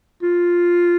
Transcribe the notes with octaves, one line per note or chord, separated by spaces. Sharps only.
F4